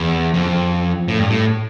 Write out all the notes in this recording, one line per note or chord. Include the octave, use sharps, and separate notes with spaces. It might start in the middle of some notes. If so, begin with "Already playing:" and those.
Already playing: E2
F2
A2
G2
A2